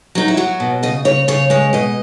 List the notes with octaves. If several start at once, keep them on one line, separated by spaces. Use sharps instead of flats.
F#3 D#4
E4
F#3 F#4
B2
C#3 D#5
C#3 C#5
C#3 C#5
G#3 C#5
B2 D#5